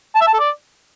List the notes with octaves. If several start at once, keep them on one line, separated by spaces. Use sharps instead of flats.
A5
E5
A5
A4
D5